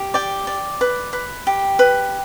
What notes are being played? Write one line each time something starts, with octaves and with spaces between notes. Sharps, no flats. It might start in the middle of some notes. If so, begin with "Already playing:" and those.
Already playing: G4
D5 G5
D5
B4
B4
G4
B4